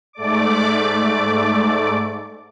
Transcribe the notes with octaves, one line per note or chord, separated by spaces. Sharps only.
G#2 A3 D5 D6